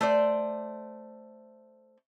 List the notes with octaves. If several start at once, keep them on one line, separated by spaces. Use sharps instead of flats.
A3 C5 D5